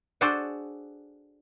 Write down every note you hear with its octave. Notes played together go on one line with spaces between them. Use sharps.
D4 F#4 G#4 A4 C5 D5